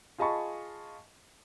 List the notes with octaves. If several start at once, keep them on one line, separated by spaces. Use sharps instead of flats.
F4 G#4 D#5 A5 B5 C#6